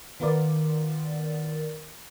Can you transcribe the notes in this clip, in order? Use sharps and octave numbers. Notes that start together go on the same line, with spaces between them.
D#3 B3 F4 A#4 D5